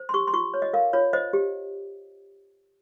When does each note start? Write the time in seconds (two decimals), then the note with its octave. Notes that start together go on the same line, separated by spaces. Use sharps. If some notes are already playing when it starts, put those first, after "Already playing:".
Already playing: C5
0.09 C6
0.14 G4 C#6
0.27 C6
0.34 F4 C#6
0.54 C#5
0.62 D#5
0.73 A#4 F5
0.93 F4 C#5
1.13 C5 D#5
1.33 G4